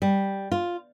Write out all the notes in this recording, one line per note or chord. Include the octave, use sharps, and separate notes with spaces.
G3
F4